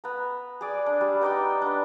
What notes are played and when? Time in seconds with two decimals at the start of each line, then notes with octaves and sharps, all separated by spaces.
0.04 B3 A#5
0.61 G#4 D5
0.86 D4
1.01 G3
1.21 B3 D#4 D5 G5
1.62 B3 D4